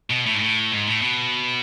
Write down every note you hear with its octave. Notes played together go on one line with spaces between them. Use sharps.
B2
A2
G#2
A2
G#2
A2
B2